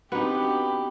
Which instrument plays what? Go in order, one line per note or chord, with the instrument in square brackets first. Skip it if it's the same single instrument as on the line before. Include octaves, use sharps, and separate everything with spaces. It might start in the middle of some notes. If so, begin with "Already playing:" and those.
[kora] B3 D#4 [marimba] C4 D4 F#4 [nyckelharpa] G4 B5